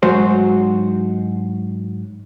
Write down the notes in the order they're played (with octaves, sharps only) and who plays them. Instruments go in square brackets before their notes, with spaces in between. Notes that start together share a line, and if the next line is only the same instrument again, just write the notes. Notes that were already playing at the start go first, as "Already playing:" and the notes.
[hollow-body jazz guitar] G#2 F#3 F#4 C5